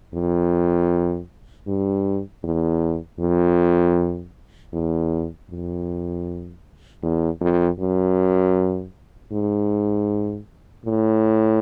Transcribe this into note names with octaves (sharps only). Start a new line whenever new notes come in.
F2
G2
E2
F2
E2
F2
E2
F2
F#2
G#2
A2